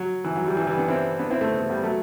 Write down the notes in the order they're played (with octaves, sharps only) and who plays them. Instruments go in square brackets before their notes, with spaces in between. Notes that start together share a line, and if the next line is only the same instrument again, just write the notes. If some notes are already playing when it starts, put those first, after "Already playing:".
Already playing: [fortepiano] F#3
E3
F#3
E3 G3
E3 G3
E3 G3
B3 D4
C4 E4
B3 D4
C4 E4
A3 C4
B3
A3
G3 B3
F#3 A3